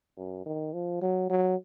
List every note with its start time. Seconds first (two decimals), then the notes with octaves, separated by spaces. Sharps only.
0.17 F#2
0.46 D#3
0.73 F3
1.01 F#3
1.30 F#3